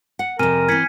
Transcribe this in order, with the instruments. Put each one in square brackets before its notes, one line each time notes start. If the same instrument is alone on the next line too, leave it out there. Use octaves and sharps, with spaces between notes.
[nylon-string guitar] F#5
[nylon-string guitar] F2 C3 [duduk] A#4 [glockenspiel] G#5 F6 D#7
[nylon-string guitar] E3 C4 [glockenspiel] G#6 B6 C#7